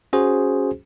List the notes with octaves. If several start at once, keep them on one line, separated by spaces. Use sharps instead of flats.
C#4 F#4 G#4 C5